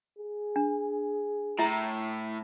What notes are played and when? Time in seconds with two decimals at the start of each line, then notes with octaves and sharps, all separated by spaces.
0.18 G#4
0.56 D4
1.59 A2 E4 E5 A#5